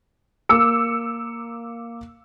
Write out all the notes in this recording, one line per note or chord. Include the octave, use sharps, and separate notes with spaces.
A#3 D6 E6 C#7